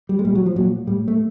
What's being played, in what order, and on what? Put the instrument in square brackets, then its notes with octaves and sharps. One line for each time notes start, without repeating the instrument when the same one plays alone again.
[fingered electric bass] G3
G#3
A#2 G3
F#3
F3
A#2 F#3
A2 G3
A3